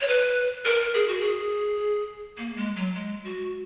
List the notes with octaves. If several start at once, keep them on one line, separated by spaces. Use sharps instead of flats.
C#5
B4
A#4
G#4
F#4
G#4
A#3
G#3
F#3
G#3
F#4